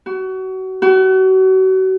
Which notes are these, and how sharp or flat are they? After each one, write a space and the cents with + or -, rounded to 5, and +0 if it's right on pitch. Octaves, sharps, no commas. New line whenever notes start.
F#4 +30
F#4 +35